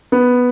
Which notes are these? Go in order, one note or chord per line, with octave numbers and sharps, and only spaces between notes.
B3